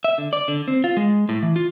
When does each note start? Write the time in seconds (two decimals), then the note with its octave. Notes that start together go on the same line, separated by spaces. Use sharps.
0.04 E5
0.18 D3
0.33 D5
0.48 D3
0.68 C4
0.84 F4
0.97 G#3
1.29 A2
1.43 E3
1.56 F4